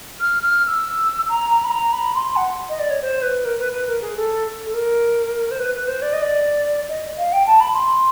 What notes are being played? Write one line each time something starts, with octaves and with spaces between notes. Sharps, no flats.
F6
F6
F6
E6
A#5
A#5
B5
A#5
B5
C6
F#5
D#5
D5
C#5
C5
B4
A#4
B4
B4
A#4
G#4
A4
A4
A#4
C5
B4
B4
C5
D5
D#5
D5
D#5
F5
G5
A5
B5
C6